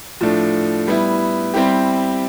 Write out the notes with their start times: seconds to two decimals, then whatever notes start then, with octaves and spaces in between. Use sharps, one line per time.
0.21 A2 F3 A3 D4
0.87 G3 B3 E4
1.54 G3 C4 E4 G4